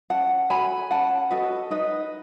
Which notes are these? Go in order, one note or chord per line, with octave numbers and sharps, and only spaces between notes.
C#4 F#5 A5
F#4 A4 G#5 B5
C#4 F#5 A5
F#4 A4 B4 D#5
D#4 B4 D#5